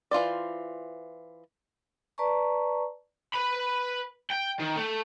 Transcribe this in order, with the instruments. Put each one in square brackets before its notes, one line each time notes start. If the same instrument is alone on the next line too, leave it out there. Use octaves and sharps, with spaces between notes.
[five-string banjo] E3 F4 C5 D5
[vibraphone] B4 D5 A5 A#5 C#6
[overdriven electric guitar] B4 B5
G5
D#3
A3